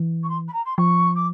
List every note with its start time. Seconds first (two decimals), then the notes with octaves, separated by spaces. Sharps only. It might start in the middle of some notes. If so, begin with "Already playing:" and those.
Already playing: E3
0.23 C#6
0.29 C6
0.48 B5
0.53 A#5
0.65 C6
0.77 F3 C#6
1.15 D6